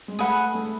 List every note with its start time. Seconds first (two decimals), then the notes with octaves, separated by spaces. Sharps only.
0.08 G#3
0.19 A3 G#4 B4 F#5
0.55 A3